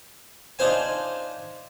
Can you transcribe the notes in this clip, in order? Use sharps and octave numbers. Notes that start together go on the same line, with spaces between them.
D4 D#4 F4 C5 G#5